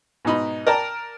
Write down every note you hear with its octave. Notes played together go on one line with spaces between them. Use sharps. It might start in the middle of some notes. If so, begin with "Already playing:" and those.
G#2 B2 D#4 B5
A#4 D5 G5 A5 A#5